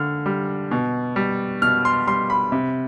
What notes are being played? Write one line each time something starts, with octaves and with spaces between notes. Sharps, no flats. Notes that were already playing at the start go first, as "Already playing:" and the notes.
Already playing: D3 F6
G3
B2
G3
B2 F6
C6
G3 C6
B5
C3